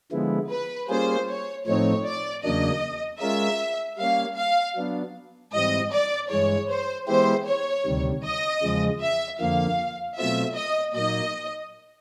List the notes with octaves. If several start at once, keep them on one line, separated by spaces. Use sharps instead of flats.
D3 F3 G#3 B3 E4
B4
G3 A#3 C#4 F4 G#4 C5
C#5
A2 F3 A3 C4 D#4 C#5
D5
E2 C#3 F#3 A#3 D4 D#5
G#3 C#4 F4 A#4 E5
G3 A#3 C#4 F5
F5
F#3 B3 D4
G#2 E3 G3 C4 D#5
D5
G2 E3 G#3 C#5
C5
E3 G#3 B3 E4 G4 C5
C#5
D2 C3 D#3 G3
D#5
E2 C#3 F3 G#3
E5
F2 D3 F3 A#3 F5
B2 F#3 A3 C4 F4 E5
D#5
A#2 F#3 A#3 D#4 D#5